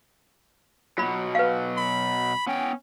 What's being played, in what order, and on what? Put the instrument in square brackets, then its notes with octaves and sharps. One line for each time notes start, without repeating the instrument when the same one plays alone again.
[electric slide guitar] B2 F#3 [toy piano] F4 B5
[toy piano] B4 F5
[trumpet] B5
[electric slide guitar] B3 G5 [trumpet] C#4